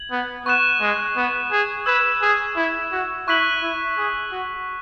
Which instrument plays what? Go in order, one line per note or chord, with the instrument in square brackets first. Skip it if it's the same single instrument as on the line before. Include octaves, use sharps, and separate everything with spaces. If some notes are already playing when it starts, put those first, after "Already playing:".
Already playing: [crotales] G#6 F#7
[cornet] B3
[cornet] B3 [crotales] C#6 F#6 E7
[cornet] G#3
B3
G#4
[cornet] B4 [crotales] E6 G#6 E7
[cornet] G#4
E4
F#4
[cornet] E4 [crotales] C#6 F#6 B6 F#7
[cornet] E4
G#4
F#4